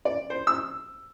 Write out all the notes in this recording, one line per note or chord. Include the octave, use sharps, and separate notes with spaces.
D5
C5
E6